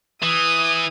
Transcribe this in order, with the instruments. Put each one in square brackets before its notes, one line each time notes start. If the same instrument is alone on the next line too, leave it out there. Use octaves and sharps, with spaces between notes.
[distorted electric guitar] E3 [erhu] D#6